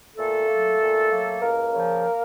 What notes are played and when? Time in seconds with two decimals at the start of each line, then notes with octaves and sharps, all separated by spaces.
0.17 A#2 A3 A4
0.49 F#3 A#3
0.80 A#2
1.10 F#3 A#3
1.41 C#2 A#3 A#4
1.73 C#3 F3